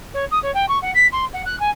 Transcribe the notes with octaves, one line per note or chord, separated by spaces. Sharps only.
C#5
D#6
C#5
G5
C#6
F#5
B6
C6
F#5
F#6
G#5